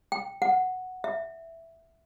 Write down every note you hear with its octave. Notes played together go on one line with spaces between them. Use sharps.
G5
F#5
E5